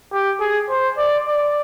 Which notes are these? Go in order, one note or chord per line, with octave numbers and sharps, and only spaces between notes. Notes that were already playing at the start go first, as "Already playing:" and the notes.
G4
G#4
C5
D5
D5